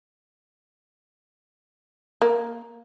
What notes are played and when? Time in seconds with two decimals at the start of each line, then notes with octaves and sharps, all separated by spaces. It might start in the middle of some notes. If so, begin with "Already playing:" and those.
2.22 A#3